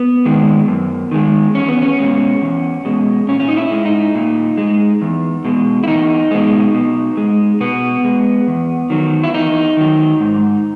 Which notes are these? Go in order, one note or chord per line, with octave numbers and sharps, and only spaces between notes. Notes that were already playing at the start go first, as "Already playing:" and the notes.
Already playing: B3
D#3 G#3
F#2
D#3 G#3
E2 C#4
B3
C#4
B2 G#3
E2
B2 G#3
A#2 C#4
C#4
D#4
E4
G#3
D#4
A#2
G#3
E2
B2 G#3
E4
E2 D#4
B2 G#3
B2
G#3
B2 B3
G#3
E2
D#3 F#3
E4
E2 D#4
D#3 F#3
G#2